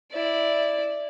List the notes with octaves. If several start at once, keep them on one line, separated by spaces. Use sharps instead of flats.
E4 D5